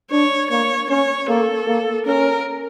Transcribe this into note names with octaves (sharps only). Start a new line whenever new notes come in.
D4 C#5
A#3 C#5
C#4 C#5
A#3 A4
A#3
C#4 A#4